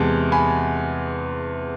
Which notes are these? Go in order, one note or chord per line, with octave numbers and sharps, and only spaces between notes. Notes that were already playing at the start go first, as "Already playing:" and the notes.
Already playing: E2 C3 G#3 A5
G#5 B5